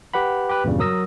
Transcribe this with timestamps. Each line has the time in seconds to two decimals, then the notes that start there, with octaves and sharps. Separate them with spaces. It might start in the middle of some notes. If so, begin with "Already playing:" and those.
0.14 G4 B4 F#5 B5
0.49 G4 B4
0.64 E2 G2 A#2 C#3 G3
0.79 F#3 A#4 D#6 E6 A#6